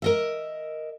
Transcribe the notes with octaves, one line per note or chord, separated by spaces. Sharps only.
A#4 D#5 E5